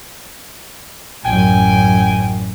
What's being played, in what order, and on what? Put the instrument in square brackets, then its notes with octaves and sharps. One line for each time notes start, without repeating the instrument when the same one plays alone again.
[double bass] A1 F#2 [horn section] G5 G#5